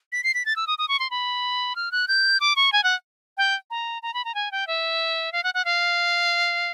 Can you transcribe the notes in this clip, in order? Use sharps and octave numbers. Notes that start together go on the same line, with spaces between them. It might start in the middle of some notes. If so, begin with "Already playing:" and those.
B6
C7
B6
A6
E6
D#6
D#6
C#6
C6
B5
F6
F#6
G6
D6
C#6
G#5
F#5
G5
A#5
A#5
B5
A#5
G#5
G5
E5
F5
F#5
F#5
F5